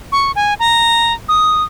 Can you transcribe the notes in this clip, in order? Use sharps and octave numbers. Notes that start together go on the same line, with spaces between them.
C#6
G#5
A#5
D#6